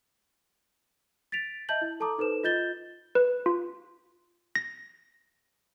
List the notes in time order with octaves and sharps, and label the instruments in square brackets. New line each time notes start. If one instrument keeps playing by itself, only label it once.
[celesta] A6 B6 D7 F7
D#5 E5 A5 G6 F#7
E4
A4 A5 A#5 D6 D#6
D#4 A4 B4 C5 E7
F4 D#5 G6 A6 G7
[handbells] B4
F4
A#6